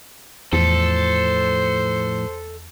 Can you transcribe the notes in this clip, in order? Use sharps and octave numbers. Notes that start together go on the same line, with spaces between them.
E2 A2 F3 A4 C5